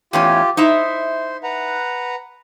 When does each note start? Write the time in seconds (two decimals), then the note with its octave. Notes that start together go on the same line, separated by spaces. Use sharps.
0.13 E2 A2 C#4 F4 G4
0.57 D#4 E4 C5 E5
1.43 B4 F#5 A#5